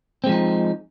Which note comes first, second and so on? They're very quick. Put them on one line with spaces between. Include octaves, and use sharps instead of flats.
C4 G#3 F3 D#4